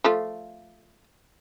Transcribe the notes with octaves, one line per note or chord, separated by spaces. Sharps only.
F3 A3 F4